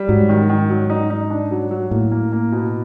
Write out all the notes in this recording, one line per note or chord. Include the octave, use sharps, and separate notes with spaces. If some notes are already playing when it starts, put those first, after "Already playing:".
Already playing: G3
G#2 F#3
D#3
D#3
F#3
D#4
D#4
D4
F#3
F#3
A2 A#3
A#3
A#3
B2